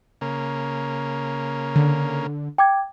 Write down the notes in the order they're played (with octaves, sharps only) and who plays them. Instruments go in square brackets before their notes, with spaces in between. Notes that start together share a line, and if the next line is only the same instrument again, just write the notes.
[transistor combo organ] C#3 A#3
[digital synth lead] D3
[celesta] G5 D6 G#6